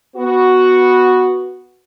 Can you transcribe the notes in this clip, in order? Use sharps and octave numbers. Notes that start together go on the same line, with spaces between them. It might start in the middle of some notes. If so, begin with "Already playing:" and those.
B3 F#4